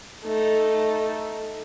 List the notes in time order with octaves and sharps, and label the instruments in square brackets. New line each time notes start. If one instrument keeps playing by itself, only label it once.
[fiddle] A3 D#4